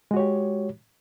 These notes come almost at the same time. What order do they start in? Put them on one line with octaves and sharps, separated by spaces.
G#3 F#4 C#5 G4